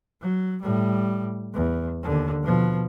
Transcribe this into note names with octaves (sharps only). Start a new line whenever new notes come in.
F#3
A2 G3
E2
D#2 D3
B2 F3